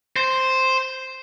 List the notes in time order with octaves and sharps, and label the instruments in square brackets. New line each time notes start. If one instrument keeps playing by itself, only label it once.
[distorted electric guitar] C5